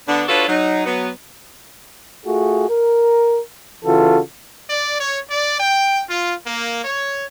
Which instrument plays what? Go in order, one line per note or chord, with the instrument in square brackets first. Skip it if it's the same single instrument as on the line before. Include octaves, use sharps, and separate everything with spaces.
[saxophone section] D3 B3 D4
D4 F4 F#4 A4 B4 C#5
F#3 D#4
F#3 B3
[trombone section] A3 F4 F#4 G#4
A#4
C#3 E3 F4 F#4 A4
[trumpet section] D5
C#5
D5
G5
F4
A#3
C#5